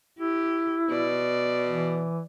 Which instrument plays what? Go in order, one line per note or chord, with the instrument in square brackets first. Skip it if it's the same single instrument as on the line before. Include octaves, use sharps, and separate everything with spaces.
[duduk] E4 [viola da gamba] G4
[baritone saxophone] B2 [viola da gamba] D5
[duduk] E3